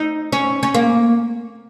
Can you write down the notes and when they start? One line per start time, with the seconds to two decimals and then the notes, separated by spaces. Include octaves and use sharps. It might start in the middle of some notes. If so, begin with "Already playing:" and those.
Already playing: D#4
0.32 C#4
0.63 C#4
0.75 A#3